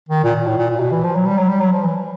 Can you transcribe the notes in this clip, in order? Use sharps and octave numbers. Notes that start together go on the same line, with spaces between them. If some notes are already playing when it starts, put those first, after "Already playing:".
D#3
A#2
A#2
A2
A#2
A#2
B2
E3
F3
F#3
G3
F#3
G3
F#3
F3
E3